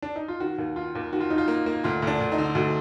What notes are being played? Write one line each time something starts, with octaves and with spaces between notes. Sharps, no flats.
D4
D#4
F4
D#3 F#4
D#2
D#3 F4
D#2
D#3 F#4
F4
D#3 D#4
F4
A#3
A#3
D2 F4
D2 D4
D2
D#4
D3
D2 F#4